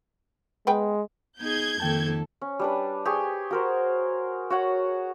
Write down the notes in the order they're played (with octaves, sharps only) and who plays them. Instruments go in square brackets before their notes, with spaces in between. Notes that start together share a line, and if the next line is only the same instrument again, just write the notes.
[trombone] G#3 [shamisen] B3 B4 G5
[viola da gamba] B3 D#4 G#4 [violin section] G6 G#6
[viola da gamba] F2 A#3 A4 [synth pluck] D#3 G5 A5
[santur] C#4
G3 D4 B4
G4 G#4 G#5 C#6
F#4 A#4 C5
F#4 C#5 F#5